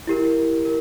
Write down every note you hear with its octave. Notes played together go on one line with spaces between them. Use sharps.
E4 G4 A#4
A#4